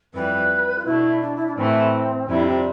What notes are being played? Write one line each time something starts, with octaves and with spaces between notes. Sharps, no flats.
F2 E3 G3 B4
F4
B2 A3 D4 E4
D4
E4
D4
A2 E3 A3 C4
F2 C3 G3 D4 E4
C4